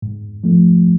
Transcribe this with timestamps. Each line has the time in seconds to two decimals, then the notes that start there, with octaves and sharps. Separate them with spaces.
0.02 G#2
0.44 F3 A3